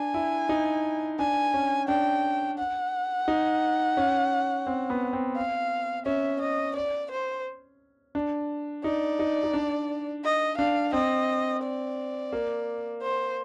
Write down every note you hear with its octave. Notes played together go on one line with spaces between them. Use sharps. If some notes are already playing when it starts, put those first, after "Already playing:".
Already playing: D4 G#5
E4
D#4
D4 G#5
C#4
D4 G5
F#5
D#4
C#4
C4
B3
C4
F5
C#4 E5
D#5
D5
C5
D4
D#4 D5
D#4
D#4
D4
D#5
D4 F5
C4 D#5
D5
A#3
C5